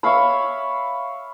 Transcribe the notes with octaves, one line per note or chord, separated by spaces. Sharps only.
C#5 E5 F5 B5